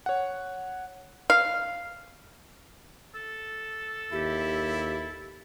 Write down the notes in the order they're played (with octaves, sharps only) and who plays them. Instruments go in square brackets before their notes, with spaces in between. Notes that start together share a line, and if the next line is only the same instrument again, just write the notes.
[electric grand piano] C#5 F#5
[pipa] F5
[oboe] A4
[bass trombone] D#2 [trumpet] E4 [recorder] G4